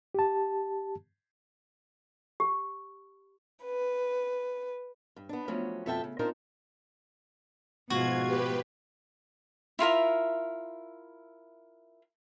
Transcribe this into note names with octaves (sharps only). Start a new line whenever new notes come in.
G4 A5
G4
B4
G2
B3 D4
F3 F#3 A3 C#4
F2 B2 A4 E5 G5 A5
C#3
C4 D4 D#4 F4 A#4 C5
G#2 B2 F3 F4 F#4 G#6
G4 B4
E4 F4 A#4 E5